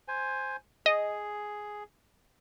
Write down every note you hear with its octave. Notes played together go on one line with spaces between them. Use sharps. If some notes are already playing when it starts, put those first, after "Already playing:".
C5 G#5
G#4 D#5